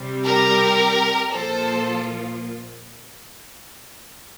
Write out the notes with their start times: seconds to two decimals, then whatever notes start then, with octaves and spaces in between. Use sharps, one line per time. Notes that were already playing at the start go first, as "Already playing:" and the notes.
Already playing: C3 G3 C4
0.24 G4 A#4
1.32 A#2 F3 A#3 F4 A4 C5